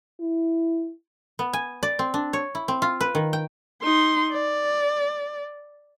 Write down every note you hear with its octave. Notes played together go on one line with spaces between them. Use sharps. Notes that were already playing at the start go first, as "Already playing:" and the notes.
E4
B3
G#5
D5
C4
D4
C#5
E4
C4
F4
B4
D#3
G5
D#4 C6
D5